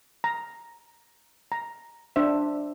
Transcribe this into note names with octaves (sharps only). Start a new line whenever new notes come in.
A#5
A#5
D4 C5 E5